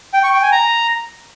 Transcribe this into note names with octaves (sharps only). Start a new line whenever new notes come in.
G5
C#6
G5
G#5
A#5